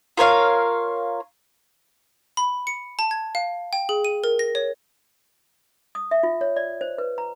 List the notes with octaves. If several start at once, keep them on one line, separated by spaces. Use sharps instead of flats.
F4 A#4 C#5 F5
B5
C#7
A5
G#6
F5
G5
G#4
D#7
A#4
A#6
C#5
D#6
E5
F4
C#5
D5
C5
B4
A#5